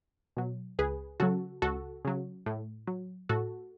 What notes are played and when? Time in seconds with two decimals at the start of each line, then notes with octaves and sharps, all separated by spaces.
0.37 B2 F#3
0.79 C#2 G#4 B4
1.20 C#3 F#3 F#4 A4
1.62 C#2 F#4 A4
2.05 C#3 F#3
2.46 A2
2.87 F#3
3.29 A2 F#4 A4